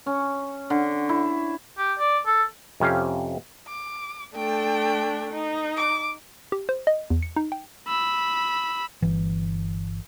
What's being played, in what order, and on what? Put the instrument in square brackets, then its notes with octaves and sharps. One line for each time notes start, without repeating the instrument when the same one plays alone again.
[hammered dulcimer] C#4
D3
E4
[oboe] G4
D5
A4
[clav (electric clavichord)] F2 C3 C#4 G4 F5
[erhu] D6
[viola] A3 D4 [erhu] G5
[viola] D#4
[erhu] D6
[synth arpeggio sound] G4
C5
D#5
E2
C#7
D#4
G5
[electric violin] B5 E6
[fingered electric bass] G1 E3